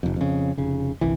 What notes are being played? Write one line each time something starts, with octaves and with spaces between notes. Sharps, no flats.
F1 F2
F2 C#3
F1 C#3
G1 C2 E3